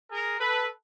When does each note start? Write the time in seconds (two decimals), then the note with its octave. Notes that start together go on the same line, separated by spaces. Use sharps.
0.09 G#4 A#4
0.40 A4 B4